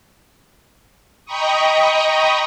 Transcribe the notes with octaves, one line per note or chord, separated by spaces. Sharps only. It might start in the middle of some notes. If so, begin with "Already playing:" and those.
D#5 G5 A#5 B5 C#6 D#6